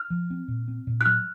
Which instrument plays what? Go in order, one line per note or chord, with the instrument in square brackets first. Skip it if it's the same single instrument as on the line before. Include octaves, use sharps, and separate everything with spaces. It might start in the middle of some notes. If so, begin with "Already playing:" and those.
Already playing: [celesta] F6
[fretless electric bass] F3
C4
A#2
C4
A#2
[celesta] F#6
[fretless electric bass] F#3 [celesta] F6